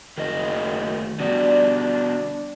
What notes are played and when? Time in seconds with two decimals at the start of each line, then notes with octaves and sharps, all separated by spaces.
0.17 F#1 D#3 A3 D#5
1.20 D3 G3 B3 D4 F#4